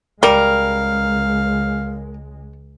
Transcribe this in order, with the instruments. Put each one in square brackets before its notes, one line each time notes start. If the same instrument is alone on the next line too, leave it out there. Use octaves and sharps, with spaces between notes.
[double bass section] C#2 G#3 [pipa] G3 [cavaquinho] A#4 [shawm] F5